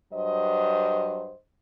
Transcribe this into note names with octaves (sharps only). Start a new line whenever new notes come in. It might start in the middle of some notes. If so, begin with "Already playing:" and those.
G2 F#3 C5 D#5